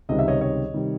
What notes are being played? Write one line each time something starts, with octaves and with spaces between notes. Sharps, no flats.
C#2 C3 D#3 G3 D#5
E5
C#5 D#5
C#5 D#5
C3 D#3 G3